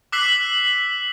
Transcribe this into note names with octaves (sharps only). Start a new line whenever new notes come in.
D6 E6 F#6 B6 C7 F#7